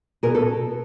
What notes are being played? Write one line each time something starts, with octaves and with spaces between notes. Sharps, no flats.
B2 G#4 A#4
A4